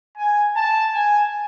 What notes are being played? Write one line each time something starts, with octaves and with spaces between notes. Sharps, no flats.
G#5
A5
G#5